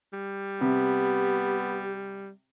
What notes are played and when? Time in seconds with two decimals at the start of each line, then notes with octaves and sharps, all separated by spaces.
0.13 G3
0.61 C3 B3 G4